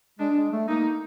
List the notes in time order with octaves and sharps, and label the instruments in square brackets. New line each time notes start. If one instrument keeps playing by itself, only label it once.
[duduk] G#3 [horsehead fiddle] D4
[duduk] G#3
A3
[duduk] A#3 [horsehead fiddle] D#4